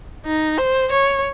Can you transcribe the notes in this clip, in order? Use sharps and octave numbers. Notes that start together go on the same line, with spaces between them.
D#4
C5
C#5